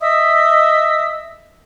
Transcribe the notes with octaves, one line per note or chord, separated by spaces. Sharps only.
D#5 E5 D#6 E6